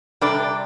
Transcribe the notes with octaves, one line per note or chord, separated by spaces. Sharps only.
C3 G3 D4 A4 D5